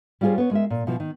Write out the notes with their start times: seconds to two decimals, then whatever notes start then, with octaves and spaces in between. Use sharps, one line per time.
0.21 G3 C#4 F4 F#4 G#4 C5
0.38 B3 C#5
0.51 G#3 A#4 E5
0.70 A#2
0.87 B2 E3 F3
1.00 D#3